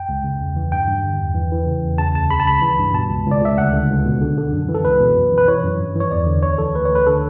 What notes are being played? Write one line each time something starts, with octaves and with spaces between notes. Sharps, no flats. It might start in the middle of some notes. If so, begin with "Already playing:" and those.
Already playing: F#2 G5
C#2
C#3
E2
E3
G2 G5
G2
D3
E2
E3
E3
C#3
E2
C#3 A5
D2 A5
C#3 B5
A5
C#2 B5
E3
G2
B2 A5
C#2
C#2
D5
C#2 E5
D2 F#5
D3
C#2
B2
D3
D3
F#2
E3
A4
C#2 B4
B2
F#2
E3
B4
E3 C#5
F#2
G2
E3 C#5
E2 D5
D3
D2 C#5
E3 A4
D2 B4
C#5
D2 B4
D3 A4